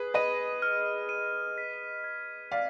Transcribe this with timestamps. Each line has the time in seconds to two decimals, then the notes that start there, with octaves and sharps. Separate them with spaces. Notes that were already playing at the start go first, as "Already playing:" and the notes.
Already playing: G#4 B4 G#6
0.14 B4 D#5 D#7
0.62 F6
1.09 D#7
1.58 B6
2.04 G#6
2.52 D5 F5 B6